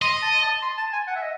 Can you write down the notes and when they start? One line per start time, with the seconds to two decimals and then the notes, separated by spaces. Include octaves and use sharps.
0.02 D#5 C6
0.23 A5
0.43 A5
0.62 C6
0.78 A5
0.93 G#5
1.07 F#5
1.16 E5
1.22 D#5